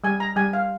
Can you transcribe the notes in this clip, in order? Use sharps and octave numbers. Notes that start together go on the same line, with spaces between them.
G3 G#5
A#5
G3 G#5
F5